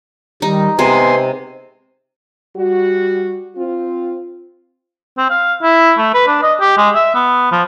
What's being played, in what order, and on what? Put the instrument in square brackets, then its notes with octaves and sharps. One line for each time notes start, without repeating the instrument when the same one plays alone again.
[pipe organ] D#3 G3 [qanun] D#4
[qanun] C3 G#3 [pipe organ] B3 G#5 C6
[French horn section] G3 F#4
C4 F4
[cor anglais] C4
F5
E4
A3
B4
D4
D#5
G4
G#3
E5
B3
F3